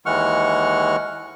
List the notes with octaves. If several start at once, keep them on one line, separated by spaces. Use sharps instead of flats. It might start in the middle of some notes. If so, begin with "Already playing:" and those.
D#2 E3 G#3 F#5 C#6 F6